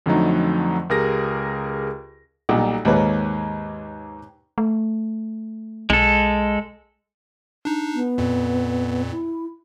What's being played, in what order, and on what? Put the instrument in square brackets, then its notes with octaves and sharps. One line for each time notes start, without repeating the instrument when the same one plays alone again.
[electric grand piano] F2 D3 F3 F#3 A3 D#4
C#2 G4 G#4 A#4 A#6
[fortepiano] B1 A#2 G3
D#2 G#2 A#3 B4 C#5
[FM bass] A3
[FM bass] B1 [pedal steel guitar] G#3 A4
[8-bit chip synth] D4 D#4
[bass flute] B3
[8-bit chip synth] F2 A#2
[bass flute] E4